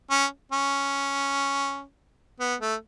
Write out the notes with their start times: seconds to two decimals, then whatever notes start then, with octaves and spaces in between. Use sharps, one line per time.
0.11 C#4
0.52 C#4
2.40 B3
2.60 A3